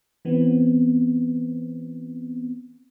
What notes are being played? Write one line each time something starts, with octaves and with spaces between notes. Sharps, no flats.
E3 B3 C4